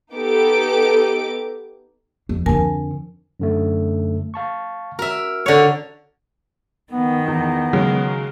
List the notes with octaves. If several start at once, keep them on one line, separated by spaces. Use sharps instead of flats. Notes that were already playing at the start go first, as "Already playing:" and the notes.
B3 D#4 G4 A4 D6 D7
F2
F2 D3 A#4 G#5 A5
F#2 D3 A3
F5 A5 C#6
F#4 A#4 E5
D3 C#5
D#3 B3
E2 B3
C#3 F#3 G#3